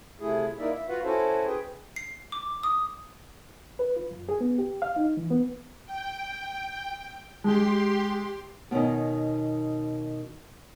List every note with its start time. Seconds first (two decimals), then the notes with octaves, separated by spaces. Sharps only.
0.20 C3 A3 E4 G#4
0.58 A#3 D#4 E4 A#4 D5 E5
0.73 E5
0.89 F4 F#4 B4 F5 F#5
1.04 C#4 E4 F#4 A4 C5
1.46 G#4 B4 G5
1.96 C7
2.32 D6
2.63 D#6
3.79 B4
3.96 F4
4.11 F#2
4.29 G#4
4.40 B3
4.58 G4
4.82 F5
4.96 D#4
5.17 E3
5.31 B3
5.86 G5
7.44 G#3 G4 C6
8.71 B2 D#3 C#4 D#4